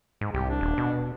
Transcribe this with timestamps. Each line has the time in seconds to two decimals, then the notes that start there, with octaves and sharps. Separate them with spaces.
0.21 G#2
0.34 C2 G4
0.49 D4
0.61 D#1
0.77 B2